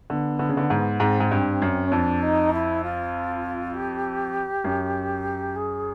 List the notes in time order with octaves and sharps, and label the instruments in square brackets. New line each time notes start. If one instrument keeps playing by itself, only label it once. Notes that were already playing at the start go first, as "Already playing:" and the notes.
[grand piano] D3 [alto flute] B3
[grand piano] D3
C#3
D3
G#2
[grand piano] G#2 [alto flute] C4
[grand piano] G#2
G2
F#2
[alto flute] C#4
[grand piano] F2 [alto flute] D4
[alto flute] D#4
E4
F4
G4
[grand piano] F#2
[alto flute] G#4